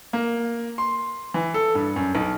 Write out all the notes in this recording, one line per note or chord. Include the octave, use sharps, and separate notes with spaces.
A#3
C6
E3
A4
G2
F#2
B1